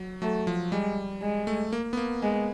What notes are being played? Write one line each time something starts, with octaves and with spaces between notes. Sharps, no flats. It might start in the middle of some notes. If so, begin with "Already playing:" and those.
Already playing: F#3
F#3 A3
F3
G3 G#3
G#3
A3
A#3
B3
A#3
G#3 B3